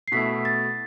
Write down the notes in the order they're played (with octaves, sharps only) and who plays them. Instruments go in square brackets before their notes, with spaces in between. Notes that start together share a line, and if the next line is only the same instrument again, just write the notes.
[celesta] C7
[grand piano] B2 A3 E4 [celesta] B6
[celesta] A6